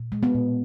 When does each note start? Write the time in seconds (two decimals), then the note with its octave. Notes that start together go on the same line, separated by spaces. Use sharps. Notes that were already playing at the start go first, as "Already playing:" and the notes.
Already playing: A#2
0.12 G#3
0.23 B3
0.34 A#2